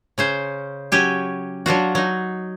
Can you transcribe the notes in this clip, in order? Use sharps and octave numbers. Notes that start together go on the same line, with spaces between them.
C#3 C#4 C5
F#3 C#4 G4 G#5
F#3 D4 F4 F#4
F#3 D#4